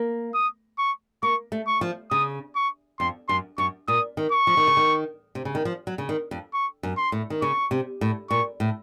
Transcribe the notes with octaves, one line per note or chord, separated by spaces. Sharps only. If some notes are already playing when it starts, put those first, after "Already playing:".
Already playing: A#3
D#6
C#6
A#3 C#6
A3
C#6
F3
C#3 D#6
C#6
F2 C6
F#2 C6
F#2 C#6
A#2 D#6
D#3
C#6
F3
D#3
C#3
D#3
C3
C#3
D#3
F3
F#3
C#3
D#3
F2
C#6
F#2
C6
A2
D#3
C#3 C#6
C3
A2
A#2 C#6
A2